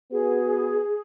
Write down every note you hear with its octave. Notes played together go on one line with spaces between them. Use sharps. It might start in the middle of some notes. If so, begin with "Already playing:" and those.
B3 F#4 G#4 B4